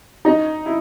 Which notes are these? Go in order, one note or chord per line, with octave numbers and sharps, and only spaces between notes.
D#4 D#5
E4